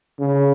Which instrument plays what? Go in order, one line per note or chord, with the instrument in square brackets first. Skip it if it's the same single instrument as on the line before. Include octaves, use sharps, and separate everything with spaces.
[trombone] C#3